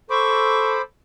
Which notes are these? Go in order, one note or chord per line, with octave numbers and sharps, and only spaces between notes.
A4 C5 B5 C#6 D6